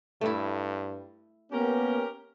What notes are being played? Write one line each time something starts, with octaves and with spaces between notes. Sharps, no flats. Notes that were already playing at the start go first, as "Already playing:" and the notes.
G2 A3 E4
A#3 B3 C#4 G4 A#4